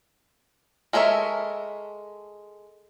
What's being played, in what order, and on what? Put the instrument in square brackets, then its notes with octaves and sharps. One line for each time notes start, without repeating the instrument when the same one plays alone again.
[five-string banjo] G#3 A4 A#4 C#5 E5